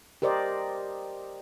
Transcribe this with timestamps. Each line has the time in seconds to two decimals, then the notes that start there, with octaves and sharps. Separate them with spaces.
0.22 G4 A#4 C5 D5 D#5